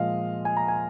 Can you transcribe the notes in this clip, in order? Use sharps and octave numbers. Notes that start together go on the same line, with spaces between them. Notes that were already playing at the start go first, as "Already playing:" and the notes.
Already playing: A#2 F3 G#3 D#5 F5
G#5
A#5
G#5